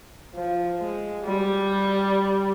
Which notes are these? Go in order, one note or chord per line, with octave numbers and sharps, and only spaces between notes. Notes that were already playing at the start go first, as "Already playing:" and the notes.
F3
G#3
G3